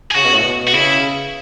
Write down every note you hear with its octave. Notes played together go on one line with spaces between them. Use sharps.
G#4
C#3 F#4
B2
A2
B2
F#4
C#3 E4